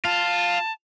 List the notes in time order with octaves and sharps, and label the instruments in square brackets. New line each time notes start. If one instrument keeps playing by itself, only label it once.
[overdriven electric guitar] F4 [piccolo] A5